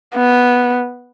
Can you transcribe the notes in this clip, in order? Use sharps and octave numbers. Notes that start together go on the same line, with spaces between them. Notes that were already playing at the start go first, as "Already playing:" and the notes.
B3